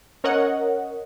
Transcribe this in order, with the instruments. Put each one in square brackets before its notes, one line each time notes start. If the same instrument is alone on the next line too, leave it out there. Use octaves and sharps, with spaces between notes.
[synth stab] C#4 A#4 C#5 D#5 F#5